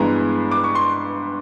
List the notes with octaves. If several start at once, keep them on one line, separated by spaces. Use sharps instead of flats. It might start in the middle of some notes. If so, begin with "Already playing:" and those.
Already playing: G2 E3 G#3 B3 A#5
D6
C#6
C6